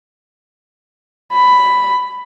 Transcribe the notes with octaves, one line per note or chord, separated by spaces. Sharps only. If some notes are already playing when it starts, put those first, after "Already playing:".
B5